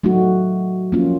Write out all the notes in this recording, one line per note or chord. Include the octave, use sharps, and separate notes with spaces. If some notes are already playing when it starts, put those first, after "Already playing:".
F#3 A3 D#4 F#4
F3 A#3 C#4 F4